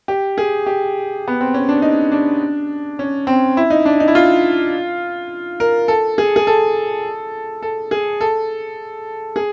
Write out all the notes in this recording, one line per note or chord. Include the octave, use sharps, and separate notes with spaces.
G4
G#4
G4
B3
C4
C#4
D4
D#4
D4
C#4
C4
E4
D#4
D4
D#4
E4
F4
A#4
A4
G#4
G#4
A4
A4
G#4
A4
G#4